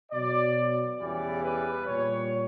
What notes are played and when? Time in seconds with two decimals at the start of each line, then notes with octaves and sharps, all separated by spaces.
0.12 B2 F#3 D5
0.99 E2 C#3 E3 G3 D5
1.43 B4
1.86 A#2 G3 C#5